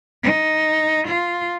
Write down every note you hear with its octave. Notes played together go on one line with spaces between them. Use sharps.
D#4
F4